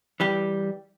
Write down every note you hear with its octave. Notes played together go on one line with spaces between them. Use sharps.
E3 G3 G4